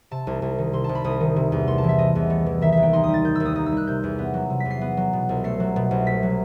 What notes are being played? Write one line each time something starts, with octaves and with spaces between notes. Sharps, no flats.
C3 A5
C2
C2
D#3
C3 C6
C2 A5
B5
C2 D#6
D#3
C3
E2
A3 C6
A5
E3 E5
C3 D#5
E2
A3
E3
D#3 E5
D#2 E5
G5
D#4 C6
G3 D#6
A6
D#3 G6
D#2 E6
D#6
D#4 D#6
E6
G3 F#6
C3 G6
E2
B3
F#3
C3
B6
E2
C7
B3
F#3
B2
C2
A3 C7
F#3
B2
C2
A3 B6
F#3